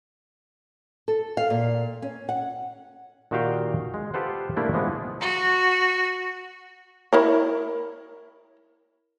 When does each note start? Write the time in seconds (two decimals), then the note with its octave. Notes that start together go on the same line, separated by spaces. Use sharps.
1.08 A4
1.37 F5
1.50 A#2
2.02 C#4
2.29 F#5
3.31 A#2 D#3 F#4 G4 F5 G5
3.94 G#3
4.14 F4 G4 A4 B4 C5 F#5
4.56 G3 A3 A#3 D4 E4 A#4
4.73 E3 F3 G#3 B3
5.21 F#4
7.13 E4 A#4 C#5